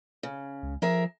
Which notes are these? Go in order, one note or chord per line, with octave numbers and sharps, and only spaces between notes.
C#3
C#2
F3 G#4 A#4 E5